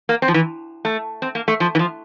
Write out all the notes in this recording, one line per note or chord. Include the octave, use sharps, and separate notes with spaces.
A#3
C4
F3
E3
A3
C4
A#3
A3
F3
E3
F3